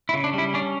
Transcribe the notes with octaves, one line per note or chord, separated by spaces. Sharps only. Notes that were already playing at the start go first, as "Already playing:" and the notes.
E4
C#3
D4
G3 E4
C#4 D4